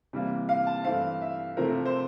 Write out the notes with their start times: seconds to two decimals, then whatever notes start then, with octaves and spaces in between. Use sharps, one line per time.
0.13 C3 E3 G3 A#3
0.49 F5
0.67 A5
0.85 G2 E3 A3 C4 F5
1.21 E5
1.57 C3 F3 A3 C4 A#4
1.86 C5